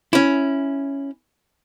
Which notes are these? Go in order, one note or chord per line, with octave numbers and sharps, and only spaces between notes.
C#4 E4